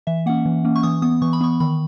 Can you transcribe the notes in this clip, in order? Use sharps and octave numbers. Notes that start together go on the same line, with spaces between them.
E3 E5
A#3 C#4 F#5
E3
A#3 C#4
C#6
E3 D#6
B3 D#6
E3 C#6
B5
B3 C#6
D#3 B5